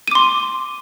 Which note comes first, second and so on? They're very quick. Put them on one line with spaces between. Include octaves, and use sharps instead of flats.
D#7 D6 C6